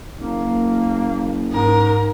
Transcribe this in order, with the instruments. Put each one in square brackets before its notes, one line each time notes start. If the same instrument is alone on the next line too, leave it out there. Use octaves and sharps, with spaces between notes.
[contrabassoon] F#1 [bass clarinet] A#3
[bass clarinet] G#2 [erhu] A#4